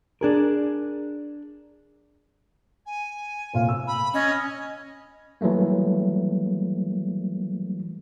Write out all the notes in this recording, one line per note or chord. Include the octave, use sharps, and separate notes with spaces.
D4 G#4 A#4
G#5
F1 A#2 F5
E6
B5
C#4 D#5
E3 F#3 G3 A3 A#3